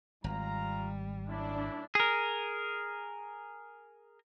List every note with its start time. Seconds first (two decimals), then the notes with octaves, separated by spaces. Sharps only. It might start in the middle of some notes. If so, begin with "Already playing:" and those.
0.24 G#1 G3 F4 F5 A#5
1.28 A#2 C#4 D4 E4
1.95 G#4 A#4